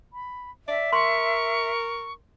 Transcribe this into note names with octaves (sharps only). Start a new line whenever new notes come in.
B5
D5 E5
A#4 C6 C#6